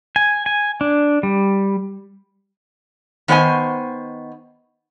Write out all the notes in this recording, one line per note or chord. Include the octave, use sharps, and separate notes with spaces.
G#5
G#5
D4
G3
D#3 B3 C5 D#5 G#5